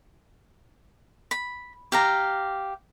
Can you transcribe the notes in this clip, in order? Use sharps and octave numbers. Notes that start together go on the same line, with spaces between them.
B5
G4 F5 A#5